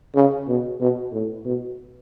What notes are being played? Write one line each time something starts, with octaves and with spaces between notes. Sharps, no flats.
C#3
B2
B2
A2
B2